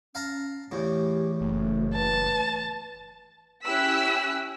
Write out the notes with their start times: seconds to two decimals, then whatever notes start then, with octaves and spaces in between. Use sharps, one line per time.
0.15 C#4 F5 A5 A#5
0.71 E2 A2 G4
1.41 F#1 A3
1.95 B4 A5
3.64 C#4 E4 G4 E6 F#6 B6